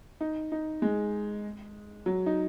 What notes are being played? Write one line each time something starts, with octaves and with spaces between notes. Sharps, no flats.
D#4
D#4
G#3
F#3
D#4